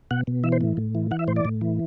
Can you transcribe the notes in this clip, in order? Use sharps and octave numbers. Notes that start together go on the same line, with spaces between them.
B2 F#5
B2
E3 E5
C5
A2
A2
E3
E3 F#5
E5
A2 C5
D5
A2
E3